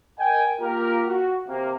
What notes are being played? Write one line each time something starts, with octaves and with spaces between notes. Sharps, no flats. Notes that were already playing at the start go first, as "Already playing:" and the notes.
A#4 D#5 G5 G#5
A#3 F4 G4 A#4
F#4
C3 A#3